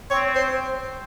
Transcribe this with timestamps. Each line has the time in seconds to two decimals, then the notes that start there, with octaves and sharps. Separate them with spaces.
0.10 C4 C#5
0.35 C5